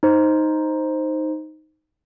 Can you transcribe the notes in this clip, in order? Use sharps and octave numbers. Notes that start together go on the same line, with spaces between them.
D#4 C5